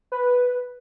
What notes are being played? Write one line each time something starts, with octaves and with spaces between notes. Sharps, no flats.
B4